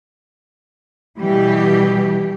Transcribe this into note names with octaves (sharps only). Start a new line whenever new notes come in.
B2 E3 G3 G4